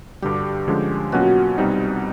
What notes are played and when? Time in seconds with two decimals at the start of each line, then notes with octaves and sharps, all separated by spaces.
0.22 G2 D3 G3 G4
0.68 D3 F3 G#3 C#4
1.12 B2 F#3 A#3 C#4 F4 F#4
1.58 C2 B2 G3 C4 D#4